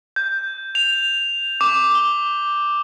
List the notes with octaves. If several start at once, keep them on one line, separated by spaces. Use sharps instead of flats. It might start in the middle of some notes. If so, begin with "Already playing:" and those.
G6
F7
D6
G7